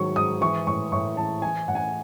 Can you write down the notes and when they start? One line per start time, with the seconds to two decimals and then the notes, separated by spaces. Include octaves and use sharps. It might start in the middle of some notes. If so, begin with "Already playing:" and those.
Already playing: G#2 D#3 F#3 C#6
0.16 G#2 D#6
0.41 E3 C#6
0.67 A2 C#6
0.92 A2 C#6
1.17 E3 A5
1.42 E3 G#5
1.68 A2 F#5
1.75 G#5
1.83 F#5